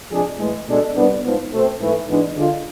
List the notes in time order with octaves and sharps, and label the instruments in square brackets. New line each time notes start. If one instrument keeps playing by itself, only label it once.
[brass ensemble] C3 F3 G#3 D4 G#4
A2 E3 G#3
B2 G#3 D4 A4
C2 B2 B3 D4
G#2 F3 B3
B2 A3 C4
G#2 E3 A3
G#2 E3 G#3 B3 D4
D3 G#3 D4 F4